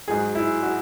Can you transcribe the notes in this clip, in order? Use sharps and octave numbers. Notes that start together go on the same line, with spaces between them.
G#2 F#3 G#4
E4
F#4